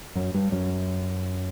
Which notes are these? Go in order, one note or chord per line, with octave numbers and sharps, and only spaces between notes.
F#2 F#3
G2 G3
F#2 F#3